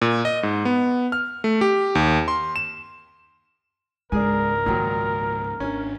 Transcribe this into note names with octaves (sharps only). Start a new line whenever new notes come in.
A#2
D#5
G#2
B3
F6
A3
G4
D#2
C6
E7
C#2 G#2 G#3 D4 E4 G#4 A#4 G#5
A#2 D#3 F#3 A#3 F4
G#1 C#4 D4